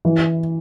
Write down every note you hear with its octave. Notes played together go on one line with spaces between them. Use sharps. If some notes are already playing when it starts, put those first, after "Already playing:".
E3